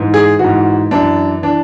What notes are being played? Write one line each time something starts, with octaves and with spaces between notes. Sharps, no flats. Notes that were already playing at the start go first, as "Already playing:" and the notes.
Already playing: G#2 E3
G#4
G#2 E3 F#4
F#2 E3 D4
E3 D4